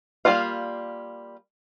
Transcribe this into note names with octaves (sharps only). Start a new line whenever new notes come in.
G3 A#3 F4 F5